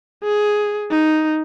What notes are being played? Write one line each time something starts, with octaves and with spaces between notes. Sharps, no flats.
G#4
D#4